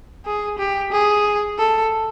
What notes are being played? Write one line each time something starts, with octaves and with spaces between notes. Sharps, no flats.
G#4
G4
G#4
A4